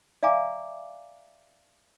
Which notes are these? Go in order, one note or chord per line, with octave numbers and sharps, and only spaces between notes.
D5 E5 F5 G#5 A#5 D6